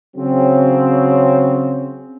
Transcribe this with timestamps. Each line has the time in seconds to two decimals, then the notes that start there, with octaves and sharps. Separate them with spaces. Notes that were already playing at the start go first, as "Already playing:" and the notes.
0.17 C#3 F#3 C4